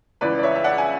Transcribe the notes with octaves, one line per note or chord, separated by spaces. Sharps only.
C#2 C#3 E3 B4 D5
D5
C#5 E5
E5
D5 F#5
G#5